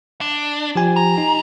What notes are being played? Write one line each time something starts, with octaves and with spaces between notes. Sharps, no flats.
D4
F3 G4 G#5
C2 A#5
D#4